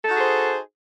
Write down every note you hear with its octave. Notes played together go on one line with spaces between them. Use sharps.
D#4 F#4 G#4 A4 C5